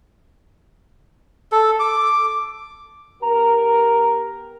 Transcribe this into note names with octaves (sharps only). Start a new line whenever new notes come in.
A4
D6
B3 G4 A#4 A#5